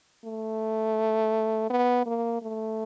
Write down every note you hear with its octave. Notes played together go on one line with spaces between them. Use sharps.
A3
B3
A#3
A3